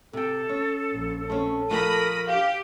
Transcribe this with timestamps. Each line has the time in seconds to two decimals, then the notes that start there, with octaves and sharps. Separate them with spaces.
0.13 C3 A4 G5
0.49 C#4
0.91 A#1
1.30 A3 C4 C#4 A4
1.71 F3 A3 D4 A#4 B5 D#6
2.28 G4 F5